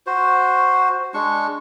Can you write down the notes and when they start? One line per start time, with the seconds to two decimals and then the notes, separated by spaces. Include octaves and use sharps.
0.07 F#4 C5
1.14 G#3 D4 C#6